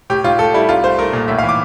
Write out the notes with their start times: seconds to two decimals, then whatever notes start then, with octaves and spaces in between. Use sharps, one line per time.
0.10 A2 G4
0.24 A2 F4
0.39 A2 A4
0.54 G3 E4
0.69 C2 F4
0.84 A3 C5
0.99 A3 A#4
1.13 A#2
1.28 A2 E5
1.39 F5
1.43 E3
1.49 D6